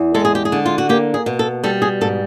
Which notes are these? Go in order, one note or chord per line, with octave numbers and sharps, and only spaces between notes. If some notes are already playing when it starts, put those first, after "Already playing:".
Already playing: E2
G#3 A4
G#4
G4
G#4
D3
F4
F#4
A#3 G4
G#4
B2
A4
G3 A4
G#4
G#2 A4